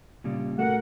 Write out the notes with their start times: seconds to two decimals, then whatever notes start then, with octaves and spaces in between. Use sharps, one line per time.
0.24 A#2 C#3 G3
0.59 A3 F#4 A#4 F#5